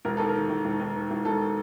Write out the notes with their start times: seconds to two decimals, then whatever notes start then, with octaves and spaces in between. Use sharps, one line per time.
0.05 E1 A#4
0.17 D#2 A4
0.29 A#4
0.35 D#3
0.49 E1
0.65 E1
0.80 D#2
0.95 D#3
1.11 E1
1.25 E1 A4